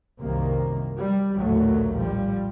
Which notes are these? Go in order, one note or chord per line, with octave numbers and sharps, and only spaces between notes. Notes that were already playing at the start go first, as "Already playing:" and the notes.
C2 F#2 C3 D#3 A#3
G3
A#1 D#2 A2 D3 F#3 A3
F3 G3